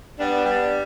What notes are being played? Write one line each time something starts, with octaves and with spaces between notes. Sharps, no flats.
G3 B3 D4
G3